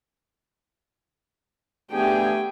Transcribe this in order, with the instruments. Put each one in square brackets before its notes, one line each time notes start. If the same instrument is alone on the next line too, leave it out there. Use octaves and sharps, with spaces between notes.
[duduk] A3 [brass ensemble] B3 D4 G#4 [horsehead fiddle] G4 G#5 [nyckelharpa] G5